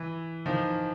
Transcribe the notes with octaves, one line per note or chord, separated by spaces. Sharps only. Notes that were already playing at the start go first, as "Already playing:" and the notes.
Already playing: E3
D#3 F3